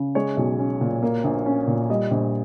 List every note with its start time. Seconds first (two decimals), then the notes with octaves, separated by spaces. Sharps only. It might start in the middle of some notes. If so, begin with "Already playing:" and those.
Already playing: C#3
0.15 G#3 C#5
0.37 B1
0.59 C#4
0.81 A#2
1.03 A#3
1.24 A#1
1.46 C#4
1.67 A#2
1.90 G3 D#5
2.11 A#1